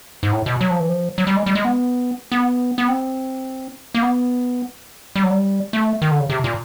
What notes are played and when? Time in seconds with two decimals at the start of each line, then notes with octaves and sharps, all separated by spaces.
0.23 G#2
0.32 A2
0.46 B2
0.61 F#3
0.70 F3
0.80 E3
0.89 F3
1.18 F#3
1.27 G3
1.36 G#3
1.46 G3
1.55 G#3
1.65 B3
2.32 B3
2.78 B3
2.88 C4
3.95 A#3
4.02 B3
5.16 G3
5.23 F#3
5.30 G3
5.73 A3
6.02 D#3
6.11 D3
6.20 C#3
6.30 C3
6.44 A#2